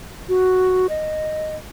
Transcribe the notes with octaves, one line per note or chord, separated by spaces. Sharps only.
F#4
D#5